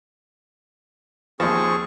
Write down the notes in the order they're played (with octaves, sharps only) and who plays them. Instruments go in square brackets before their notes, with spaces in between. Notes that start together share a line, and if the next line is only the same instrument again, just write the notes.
[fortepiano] D#2 F3 [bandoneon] C4 G#4 C#6